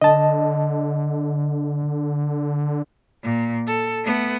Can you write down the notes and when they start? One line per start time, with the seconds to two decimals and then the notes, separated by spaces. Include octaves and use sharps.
0.01 D3 D#5 A5
3.23 A#2
3.67 A4
4.04 A3 B3